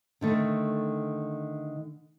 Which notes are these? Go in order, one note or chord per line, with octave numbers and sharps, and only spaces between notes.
D3 D#3 A3